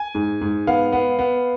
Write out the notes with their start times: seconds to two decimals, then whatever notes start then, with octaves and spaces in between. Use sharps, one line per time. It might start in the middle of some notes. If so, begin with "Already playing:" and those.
Already playing: G#5
0.15 G#2
0.41 G#2
0.67 B3 F5
0.92 B3
1.19 B3